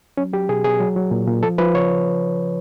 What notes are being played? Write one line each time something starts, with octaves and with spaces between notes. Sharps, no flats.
F#3 C#4
F#3 G4
B2 G#4
B2 G#4
F#3
F#3
A#2
A#2
F3 A4
F3 B4
C#3 C#5